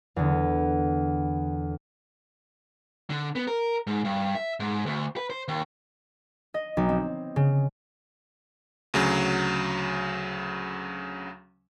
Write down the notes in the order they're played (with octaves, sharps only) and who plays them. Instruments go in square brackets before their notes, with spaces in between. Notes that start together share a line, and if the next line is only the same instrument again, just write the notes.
[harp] E2 D3
[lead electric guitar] D3
B3
A#4
G#2
G2
E5
G#2
D2
B4
C5
D#2
[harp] D#5
B1
C4
C#3
[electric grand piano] D2 C#3 F#3